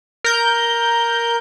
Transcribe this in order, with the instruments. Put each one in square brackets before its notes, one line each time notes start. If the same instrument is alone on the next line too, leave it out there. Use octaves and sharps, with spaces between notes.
[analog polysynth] A#4 G6